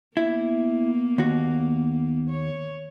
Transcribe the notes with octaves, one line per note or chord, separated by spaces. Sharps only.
A#3 B3 E4
D#2 F#4
C#5